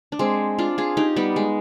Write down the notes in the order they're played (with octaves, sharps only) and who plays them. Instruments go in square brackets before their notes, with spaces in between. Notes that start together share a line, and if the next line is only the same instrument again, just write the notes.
[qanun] D4
G#3 C4
D4 F4
F4 G#4
D#4 G4
G3 B3
G#3